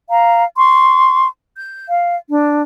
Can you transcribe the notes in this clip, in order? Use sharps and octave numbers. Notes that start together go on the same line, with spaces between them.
F5 A#5
C6 C#6
G6
F5
D4